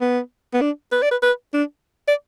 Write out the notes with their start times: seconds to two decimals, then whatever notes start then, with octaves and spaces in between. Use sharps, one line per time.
0.01 B3
0.54 B3
0.61 D4
0.92 B4
1.02 D5
1.11 B4
1.23 B4
1.54 D4
2.08 D5